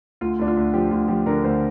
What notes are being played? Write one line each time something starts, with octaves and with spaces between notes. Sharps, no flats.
D2 F4
D2 D4
F4
D2
F3 G4
D2 F4
F3 G4
D3 A#4
D2 C5